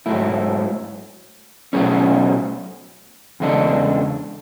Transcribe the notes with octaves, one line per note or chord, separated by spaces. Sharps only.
G#2 F#3 A3 E4
B2 F#3 A3 C#4 G#4
E2 C#3 G#3 D4 A4